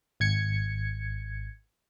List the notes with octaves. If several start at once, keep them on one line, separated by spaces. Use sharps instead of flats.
G#1 G#6 C#7